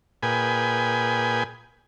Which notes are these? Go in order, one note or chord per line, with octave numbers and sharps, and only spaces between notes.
A#2 G#4 B4 G5 G#5